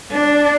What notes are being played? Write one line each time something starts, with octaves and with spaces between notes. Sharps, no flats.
D4